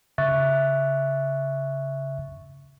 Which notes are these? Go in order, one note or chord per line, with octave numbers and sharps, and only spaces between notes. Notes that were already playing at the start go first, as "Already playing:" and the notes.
C#3 E5 C#6 F#6 A6